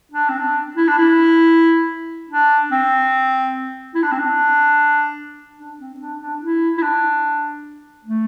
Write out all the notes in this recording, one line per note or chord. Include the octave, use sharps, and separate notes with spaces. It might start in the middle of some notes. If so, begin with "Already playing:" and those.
D4
C4
D4
E4
D4
E4
D4
C4
E4
D4
C4
D4
D4
C4
D4
D4
E4
E4
D4
A3